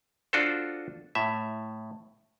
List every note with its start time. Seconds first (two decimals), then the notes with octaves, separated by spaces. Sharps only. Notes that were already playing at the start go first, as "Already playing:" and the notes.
0.33 D4 F4 F#4 A4 C5
1.15 A2 E5